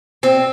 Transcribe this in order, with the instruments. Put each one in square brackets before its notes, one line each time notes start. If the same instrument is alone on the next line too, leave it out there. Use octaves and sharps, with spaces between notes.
[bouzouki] C4